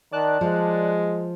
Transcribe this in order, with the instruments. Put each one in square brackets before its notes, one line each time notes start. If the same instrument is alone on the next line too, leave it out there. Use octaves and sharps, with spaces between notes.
[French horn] D#3 [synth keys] D5 A5 F#6
[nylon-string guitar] F3 [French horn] G#3